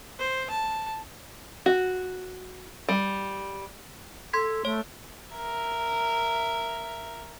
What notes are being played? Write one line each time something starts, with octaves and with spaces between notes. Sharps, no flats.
C5
A5
F#4
G3
A4 C6 G#6 B6
A3 C#5
A#4 E5